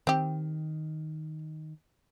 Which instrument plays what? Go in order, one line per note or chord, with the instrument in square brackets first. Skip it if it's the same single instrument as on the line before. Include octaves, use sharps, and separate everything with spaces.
[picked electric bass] D#3 [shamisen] C4 G4